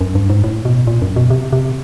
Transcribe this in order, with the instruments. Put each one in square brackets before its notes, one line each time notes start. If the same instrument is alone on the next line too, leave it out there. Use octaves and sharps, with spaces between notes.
[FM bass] F#2
G2
G#2
A2
B2
A#2
F#2
B2
C3
C3